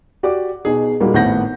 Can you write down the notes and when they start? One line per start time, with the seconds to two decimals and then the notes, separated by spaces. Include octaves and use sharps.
0.23 F#4 G4 D5 D6
0.65 B2 D#4 G#4
1.00 A#2 G3 G#3 A#3 D#4 F#4
1.14 G#1 A2 B3 F#5 G6 A#6